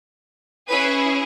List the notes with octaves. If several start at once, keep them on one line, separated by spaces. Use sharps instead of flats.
C#4 E4 G#4 B4